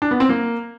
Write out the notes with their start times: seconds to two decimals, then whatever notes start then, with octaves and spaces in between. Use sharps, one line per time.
0.02 D4
0.11 B3
0.20 C4
0.29 A#3